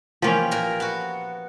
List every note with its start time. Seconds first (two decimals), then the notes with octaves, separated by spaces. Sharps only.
0.22 E3 F3 A#3 C#4 G4
0.51 A#2 A#4
0.80 B3 F#4